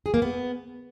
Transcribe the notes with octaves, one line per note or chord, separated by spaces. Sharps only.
G#4
A#3
B3